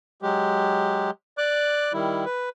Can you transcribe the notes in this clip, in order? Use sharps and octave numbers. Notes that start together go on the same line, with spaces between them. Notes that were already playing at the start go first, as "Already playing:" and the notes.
F#3 G#3 G4
D5 D6 F#6
D#3 G3 E4
B4